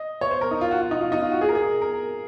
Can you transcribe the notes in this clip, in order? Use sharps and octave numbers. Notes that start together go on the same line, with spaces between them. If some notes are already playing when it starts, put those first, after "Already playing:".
Already playing: D#5
C#5
C5
A#4
D#4
F4
F#4
F4
D#4
F4
D#4
F4
F#4
G#4
A#4
G#4
A#4